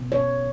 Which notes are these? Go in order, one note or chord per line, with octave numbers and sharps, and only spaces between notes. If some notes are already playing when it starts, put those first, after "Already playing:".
Already playing: B2 B3
C#5